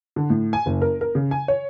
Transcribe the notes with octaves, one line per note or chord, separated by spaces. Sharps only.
D3
A2
G#5
F#1
A#4
A#4
C#3
G#5
C#5